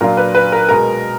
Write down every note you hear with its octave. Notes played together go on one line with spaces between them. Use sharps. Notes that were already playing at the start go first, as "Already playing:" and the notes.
A#2 F#3 D4 F4 A#4
B4
B4
A#4
B2 G#3 A#4